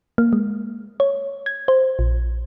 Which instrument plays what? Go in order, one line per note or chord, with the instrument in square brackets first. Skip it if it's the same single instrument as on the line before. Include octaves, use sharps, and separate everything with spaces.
[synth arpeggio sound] A#3
G#3
C#5
G#6
C5
A#1